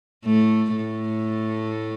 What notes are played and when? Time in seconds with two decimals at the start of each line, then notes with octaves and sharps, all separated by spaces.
0.25 A2 A3
0.77 A2 A3